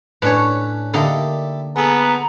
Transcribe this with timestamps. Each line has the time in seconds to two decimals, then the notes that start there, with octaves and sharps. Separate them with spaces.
0.22 A2 C#4 D4 B4 C#5
0.94 D3 A#3 D#4 E4 G4 A4
1.76 B3 G#4 A4 A#5